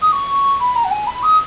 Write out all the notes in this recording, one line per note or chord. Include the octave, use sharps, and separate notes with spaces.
D#6
C#6
B5
A#5
F#5
G#5
B5
D#6